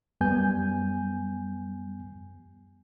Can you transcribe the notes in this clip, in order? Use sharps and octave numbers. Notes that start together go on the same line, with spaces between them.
F#2 G3 B3 G#5 G6